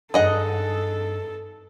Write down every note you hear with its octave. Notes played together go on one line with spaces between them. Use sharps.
G2 D#4 G#4 A4 D#5 F#5